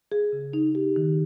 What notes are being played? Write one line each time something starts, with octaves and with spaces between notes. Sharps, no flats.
G#4
C#3
D#4
G4
D#3